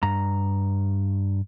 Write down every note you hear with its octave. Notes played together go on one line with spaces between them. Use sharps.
G2 A#5